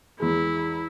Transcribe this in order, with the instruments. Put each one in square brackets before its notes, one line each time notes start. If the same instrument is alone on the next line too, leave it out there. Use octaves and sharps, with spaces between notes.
[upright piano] E2 G#3 [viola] E4